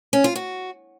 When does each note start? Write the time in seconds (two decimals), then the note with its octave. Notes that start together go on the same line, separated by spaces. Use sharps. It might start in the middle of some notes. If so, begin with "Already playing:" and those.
0.13 C#4
0.24 F4
0.36 F#4